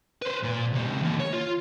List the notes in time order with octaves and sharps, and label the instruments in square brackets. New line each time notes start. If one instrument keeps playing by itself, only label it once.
[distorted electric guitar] B4 C5
A#2 A#4
C#2 C4
E3 A#3
C#5
F4